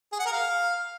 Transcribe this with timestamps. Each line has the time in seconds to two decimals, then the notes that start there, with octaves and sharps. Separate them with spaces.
0.13 G#4
0.19 F#5
0.26 A#4
0.32 F5